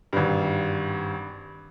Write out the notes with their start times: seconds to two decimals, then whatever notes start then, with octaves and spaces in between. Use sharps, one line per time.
0.13 G#1 G2